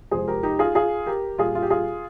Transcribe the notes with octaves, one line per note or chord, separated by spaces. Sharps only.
F2 C3 F3 G#3 G#4 C5
G4 A#4
D#4 G4
F4 G#4
F4 G#4
G4 A#4
A#2 G3 F4 G#4
F4
G4
F4 G#4